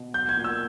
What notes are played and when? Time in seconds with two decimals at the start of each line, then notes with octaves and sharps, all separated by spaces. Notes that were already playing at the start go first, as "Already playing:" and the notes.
Already playing: B2
0.14 F#3 G6
0.29 G#6
0.37 A#2
0.44 E6